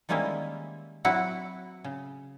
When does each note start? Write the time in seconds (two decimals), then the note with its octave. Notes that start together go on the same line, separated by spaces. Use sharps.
0.09 D#3 G3 G#3 A#3 C#4 E4
1.05 F#3 C4 E4 F#4 F#5
1.84 C#3